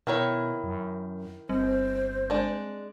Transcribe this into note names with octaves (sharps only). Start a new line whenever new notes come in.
B2 D#3 E4 C#5
F#2
G1 G3 C4 C5
G#3 D4